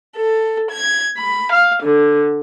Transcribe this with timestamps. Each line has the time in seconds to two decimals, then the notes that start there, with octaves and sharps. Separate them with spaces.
0.16 A4
0.70 G#6
1.17 B5
1.52 F5
1.84 D3